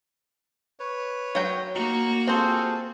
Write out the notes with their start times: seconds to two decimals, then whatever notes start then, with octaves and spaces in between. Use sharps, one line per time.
0.79 B4 C#5
1.35 F#3 G5
1.75 A#3 D#4 F#4
2.27 C4 F4 G#4 A4 C5